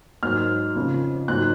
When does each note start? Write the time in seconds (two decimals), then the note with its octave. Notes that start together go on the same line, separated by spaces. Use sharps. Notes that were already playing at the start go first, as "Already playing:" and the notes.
0.23 G#2 F#3 F6
0.75 F2 C#3 F3
1.28 G#2 F#3 F#6